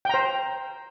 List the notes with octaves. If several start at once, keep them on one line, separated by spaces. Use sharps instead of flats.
C5 G5 A#5